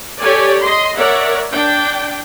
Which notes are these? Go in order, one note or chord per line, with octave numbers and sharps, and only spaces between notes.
G4 A4 C#5 D5 G#5
D#5 C6
A#4 C#5 D5 E5 F#5
D4 G5